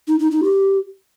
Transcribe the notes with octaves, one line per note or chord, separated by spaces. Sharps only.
D#4
D#4
D#4
G4